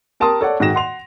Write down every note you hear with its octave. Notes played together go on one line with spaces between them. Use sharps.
G4 A#4 A5 A#5 C6 D#6
A4 C#5 D5 F#5
G#2 D#3 F#4 G5 A#6 E7
F#5 C6 F7